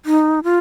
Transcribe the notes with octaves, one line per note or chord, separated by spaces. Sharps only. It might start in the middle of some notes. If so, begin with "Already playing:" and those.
D#4
F4